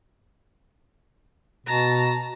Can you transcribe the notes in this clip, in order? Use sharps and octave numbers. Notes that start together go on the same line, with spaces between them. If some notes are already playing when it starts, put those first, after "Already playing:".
B2 A5 A#5